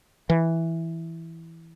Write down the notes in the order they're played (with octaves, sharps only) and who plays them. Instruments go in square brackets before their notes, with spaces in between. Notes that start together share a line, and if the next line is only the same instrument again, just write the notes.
[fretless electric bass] E3